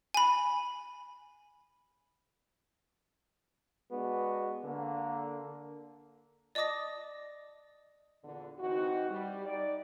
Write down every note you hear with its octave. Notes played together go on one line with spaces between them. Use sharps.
G#5 B5
G#3 B3 D4 F#4
D3 A#3
D5 D#5 A5 D6 D#6 A#6
E2 A#2 D3
E3 C4 D#4 F#4
G3
D#4 D5